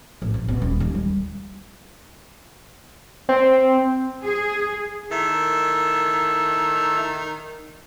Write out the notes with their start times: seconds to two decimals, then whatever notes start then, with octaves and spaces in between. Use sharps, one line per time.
0.22 A1
0.34 C3
0.48 B2
0.62 D#1
0.80 D#2
0.94 G3
3.29 C4
4.24 G#4
5.11 D#3 E4 A4 E5